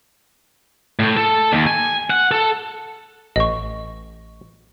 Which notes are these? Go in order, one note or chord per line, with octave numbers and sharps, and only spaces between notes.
A2
A4
D#2
G#5
F#5
A4
A1 D#5 C#6